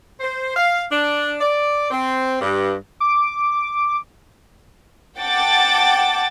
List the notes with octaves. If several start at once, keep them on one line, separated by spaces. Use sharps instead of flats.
C5
F5
D4
D5
C4
G2
D6
F#5 G5 A5 D6 A6